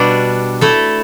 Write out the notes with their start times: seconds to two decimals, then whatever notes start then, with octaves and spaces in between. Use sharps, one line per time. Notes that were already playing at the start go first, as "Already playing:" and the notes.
Already playing: B2 G3 D4 F#4
0.61 A3 E4 A4